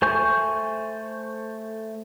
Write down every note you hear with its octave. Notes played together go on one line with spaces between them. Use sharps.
A3 C5 G#5 C#6 G6